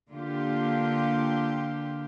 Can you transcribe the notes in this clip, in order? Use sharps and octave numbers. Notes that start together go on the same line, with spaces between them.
D3 A#3 F4 G4